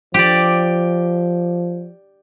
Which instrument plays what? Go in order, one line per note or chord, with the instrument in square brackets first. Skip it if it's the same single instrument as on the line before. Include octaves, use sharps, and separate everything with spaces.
[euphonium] F3 [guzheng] G4 D5